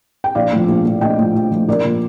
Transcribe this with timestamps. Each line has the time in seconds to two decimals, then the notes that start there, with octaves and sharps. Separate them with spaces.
0.24 G5
0.35 A#1 D5 F5
0.52 A2 F3
0.68 A#1
0.84 A2 F3
1.01 A#1 D#5 G5
1.18 A2 F3
1.34 A#1
1.51 A2 F3
1.68 A#1 A#4 D5
1.85 A#2 F3